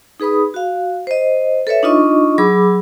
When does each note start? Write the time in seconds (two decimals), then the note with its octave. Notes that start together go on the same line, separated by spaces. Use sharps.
0.20 D#4 G#4 B4 B5 D#6
0.54 F#4 F5
1.07 C5 D#5
1.67 A4 B4 C#5 E5
1.83 D4 D#4 F4 D#5 C#6
2.38 F#3 G#4 B5 D6 E6